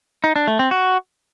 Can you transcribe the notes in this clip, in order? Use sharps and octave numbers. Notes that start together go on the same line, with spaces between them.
D#4
D4
A3
C4
F#4